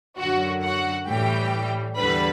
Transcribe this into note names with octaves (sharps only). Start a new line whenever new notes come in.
F#2 D3 F#3 F#4 F#5
F#4 F#5
A2 E3 G3 G4 G5
E2 D3 G3 B4 B5